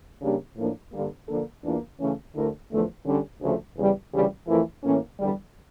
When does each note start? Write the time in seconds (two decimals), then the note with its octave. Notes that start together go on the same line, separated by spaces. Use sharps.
0.21 C#3 G3 A#3 D4 G4
0.56 A2 F3 A#3 D4
0.92 G2 D3 G3 A#3
1.28 D3 F3 A#3 D4 A4
1.63 E2 E3 A#3 D4 F4
1.99 C#3 E3 A3 C#4
2.35 D2 D3 A3 E4 A#4
2.71 E2 D3 F3 A3
3.06 D3 G3 C#4
3.41 D2 C#3 F3 A3
3.77 E2 C#3 G3
4.12 D2 C#3 E3 G3
4.47 F2 E3 A3 E4 A#4
4.83 A2 E3 A#3 C#4
5.19 E2 D3 G3